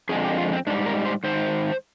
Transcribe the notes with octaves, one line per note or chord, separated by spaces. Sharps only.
F2 D3 G#3 G#4
G4
F4
C4
G#2 G3 D4
A#4
C5
G#2 D#3 C5